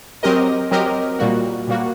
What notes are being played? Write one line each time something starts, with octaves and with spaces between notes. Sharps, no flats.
F#3 C4 G4 A#4 D#5
F#3 C4 G4 A#4 D#5
A#2 G3 A#3 F#4
A#2 G3 A#3 F#4